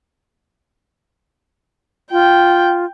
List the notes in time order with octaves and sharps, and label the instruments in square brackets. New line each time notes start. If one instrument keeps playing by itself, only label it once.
[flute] F4 [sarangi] G5